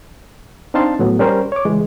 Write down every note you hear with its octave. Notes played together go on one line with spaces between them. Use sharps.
C4 D4 D#4 F5 A5 C6
A2 F#3 B3
G3 C#4 A#4 C5
C#5 D6
C#2 E3 G#3